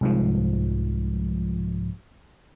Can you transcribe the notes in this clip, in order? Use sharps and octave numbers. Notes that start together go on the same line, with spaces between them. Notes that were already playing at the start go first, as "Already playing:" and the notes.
C2 G#2 F3